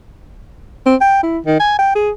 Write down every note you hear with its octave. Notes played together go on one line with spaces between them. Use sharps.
C4
G5
E4
D#3
G#5
G5
G#4